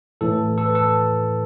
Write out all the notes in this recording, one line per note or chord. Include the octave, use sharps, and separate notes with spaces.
A2 E3 A4
A4
B4
A4